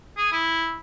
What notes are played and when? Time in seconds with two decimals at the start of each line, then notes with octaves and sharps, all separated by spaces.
0.17 G#4
0.32 E4